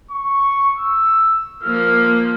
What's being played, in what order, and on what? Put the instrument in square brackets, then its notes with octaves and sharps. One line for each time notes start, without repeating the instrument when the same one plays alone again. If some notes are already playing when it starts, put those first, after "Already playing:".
[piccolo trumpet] C#6
E6
[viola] F3 A#3 [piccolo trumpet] F6